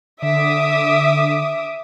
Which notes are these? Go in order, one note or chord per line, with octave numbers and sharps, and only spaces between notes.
D3 E5 D6 D#6